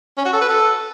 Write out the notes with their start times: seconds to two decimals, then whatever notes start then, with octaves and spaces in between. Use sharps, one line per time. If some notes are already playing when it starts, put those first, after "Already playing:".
0.18 C#4
0.25 F#4
0.33 A4
0.41 B4
0.49 A4